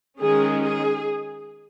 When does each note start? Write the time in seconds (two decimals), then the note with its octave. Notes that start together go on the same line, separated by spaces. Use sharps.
0.20 D#3 G#3 C#4 G#4
0.63 G#4